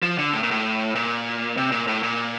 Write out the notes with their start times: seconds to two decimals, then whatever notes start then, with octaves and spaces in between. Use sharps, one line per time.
0.02 F3
0.18 D3
0.33 A2
0.43 A#2
0.51 A2
0.95 A#2
1.57 C3
1.72 A#2
1.87 A2
2.03 A#2